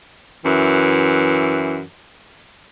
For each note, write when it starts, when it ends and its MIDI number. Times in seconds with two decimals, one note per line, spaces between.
0.44 1.81 42
0.44 1.81 52